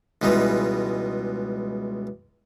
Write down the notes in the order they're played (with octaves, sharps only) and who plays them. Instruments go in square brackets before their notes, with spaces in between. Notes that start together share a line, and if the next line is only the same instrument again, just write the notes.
[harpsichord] C#2 B2 E3 G3 G#3